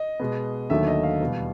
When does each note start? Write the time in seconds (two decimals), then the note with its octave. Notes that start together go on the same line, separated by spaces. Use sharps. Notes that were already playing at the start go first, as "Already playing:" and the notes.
Already playing: D#5
0.20 B2 G#3 B3
0.70 D#2 D3 F#3 A3 E5
0.87 D#5
1.03 F5
1.21 E2 B2 G3 B3